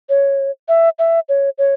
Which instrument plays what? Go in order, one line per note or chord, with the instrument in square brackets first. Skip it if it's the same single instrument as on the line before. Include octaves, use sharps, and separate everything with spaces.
[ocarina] C#5
E5
E5
C#5
C#5